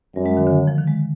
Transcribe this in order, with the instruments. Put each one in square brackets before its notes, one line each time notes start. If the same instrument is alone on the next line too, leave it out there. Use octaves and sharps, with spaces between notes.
[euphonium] F#2 [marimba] G3
[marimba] G#3
D#3
D3
F3
D#3
G#3